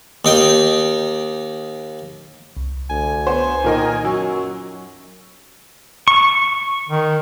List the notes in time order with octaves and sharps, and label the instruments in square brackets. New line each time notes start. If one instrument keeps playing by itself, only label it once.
[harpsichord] D#2 D#4 G5
[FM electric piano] C2
[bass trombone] D2 [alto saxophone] G#5
[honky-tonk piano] B3 C5
[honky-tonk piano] A#2 A#4 D#5 [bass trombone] D#3
[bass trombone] F#2 [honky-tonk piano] F#3 [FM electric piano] C#6 E6
[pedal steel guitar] C#6
[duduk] D#3